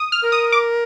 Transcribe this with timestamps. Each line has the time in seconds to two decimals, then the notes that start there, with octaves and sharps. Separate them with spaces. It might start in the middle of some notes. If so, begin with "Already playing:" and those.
Already playing: D#6
0.12 F6
0.22 A#4
0.32 D#6
0.52 D6